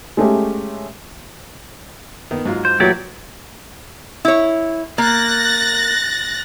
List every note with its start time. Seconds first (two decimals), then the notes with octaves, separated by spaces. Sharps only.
0.17 G#3 A3 C#4 G4
2.31 D#3 B3
2.45 G#2 F#3 F4
2.65 C5
2.80 A#2 E3 F#3 A3 G4 C#5 D5
4.25 E4 C#5
4.98 A#3 F#6 A6 A#6